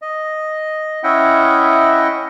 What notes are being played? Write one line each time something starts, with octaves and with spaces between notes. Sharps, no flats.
D#5
C#4 E4 D#5 E5 F#5 G5